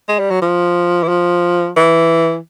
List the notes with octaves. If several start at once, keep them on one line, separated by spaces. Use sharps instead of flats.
G#3
G3
F#3
F3
E3
F3
E3